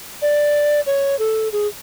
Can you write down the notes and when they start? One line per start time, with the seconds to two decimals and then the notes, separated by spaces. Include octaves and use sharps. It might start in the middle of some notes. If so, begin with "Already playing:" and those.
0.22 D5
0.86 C#5
1.19 A4
1.52 G#4